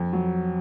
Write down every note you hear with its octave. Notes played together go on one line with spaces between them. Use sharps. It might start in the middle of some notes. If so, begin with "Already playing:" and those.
Already playing: F2
F#3